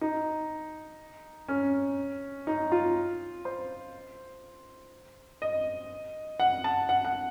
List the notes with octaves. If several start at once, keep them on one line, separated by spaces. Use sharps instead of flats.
D#4
C#4
D#4
F4
C5
D#5
F#5
A5
F#5
F#5